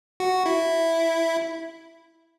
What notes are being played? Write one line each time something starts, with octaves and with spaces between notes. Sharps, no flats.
F#4
E4